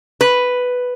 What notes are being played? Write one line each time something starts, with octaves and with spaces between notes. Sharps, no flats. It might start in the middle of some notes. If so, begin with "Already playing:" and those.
B4